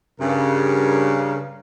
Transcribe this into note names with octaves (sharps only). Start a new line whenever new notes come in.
G2 C#3 A#4